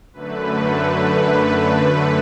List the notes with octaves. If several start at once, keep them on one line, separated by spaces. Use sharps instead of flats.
F#2 D3 A3 B4
B4